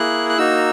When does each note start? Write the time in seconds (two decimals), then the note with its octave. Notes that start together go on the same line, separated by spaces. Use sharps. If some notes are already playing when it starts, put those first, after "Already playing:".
Already playing: A#3 E4 G#4 F#6
0.29 F#6
0.38 A#3 D#4 F#4 E6